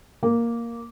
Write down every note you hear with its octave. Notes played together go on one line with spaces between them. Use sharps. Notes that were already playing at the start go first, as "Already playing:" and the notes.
A#3